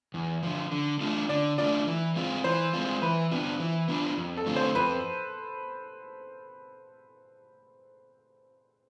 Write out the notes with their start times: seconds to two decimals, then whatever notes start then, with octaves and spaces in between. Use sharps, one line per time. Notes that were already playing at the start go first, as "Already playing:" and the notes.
0.14 E2
0.43 D3 F3
0.72 D3
1.01 A3 D4 F4
1.29 D3 D5
1.58 A3 D4 F4 D5
1.87 E3
2.16 G#3 C4 F4
2.44 E3 C5
2.73 G#3 C4 F4
3.02 E3 B4
3.31 B3 D4 F4
3.60 E3
3.88 B3 D4 F4
4.17 F2
4.37 A4
4.46 D3 A3 C4 F4
4.56 C5
4.75 F2 B4